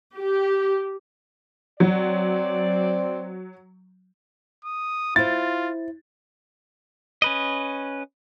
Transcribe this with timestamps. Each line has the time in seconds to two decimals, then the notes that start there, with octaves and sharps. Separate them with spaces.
0.19 G4
1.80 F#3 C4 D5
4.65 D#6
5.16 E4 F4 C5 A6
7.22 C#4 B4 D#5